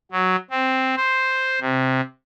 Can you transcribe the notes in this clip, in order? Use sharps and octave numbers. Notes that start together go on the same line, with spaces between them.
F#3
C4
C5
C3